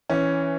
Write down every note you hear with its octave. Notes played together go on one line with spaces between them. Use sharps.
E3 C#4